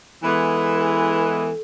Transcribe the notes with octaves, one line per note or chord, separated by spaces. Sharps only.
E3 G#3 B3 A4